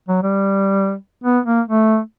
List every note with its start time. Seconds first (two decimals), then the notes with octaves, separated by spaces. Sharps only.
0.08 F#3
0.23 G3
1.24 B3
1.46 A#3
1.68 A3